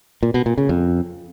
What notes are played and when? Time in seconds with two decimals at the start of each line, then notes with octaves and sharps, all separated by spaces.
0.23 A#2
0.34 B2
0.46 A#2
0.58 C#3
0.69 F2